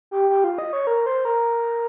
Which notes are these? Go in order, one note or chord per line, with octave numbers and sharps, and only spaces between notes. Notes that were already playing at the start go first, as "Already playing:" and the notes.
G4
G4
F4
D#5
C#5
A#4
C5
A#4